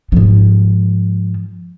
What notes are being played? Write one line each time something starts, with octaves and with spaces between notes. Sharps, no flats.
G#2 F3